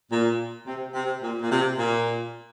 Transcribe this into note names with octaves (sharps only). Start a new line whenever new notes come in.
A#2
C3
C3
A#2
A#2
C3
A#2